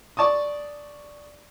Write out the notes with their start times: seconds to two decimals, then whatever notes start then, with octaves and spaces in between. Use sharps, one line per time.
0.17 D5 A5 C#6 D#6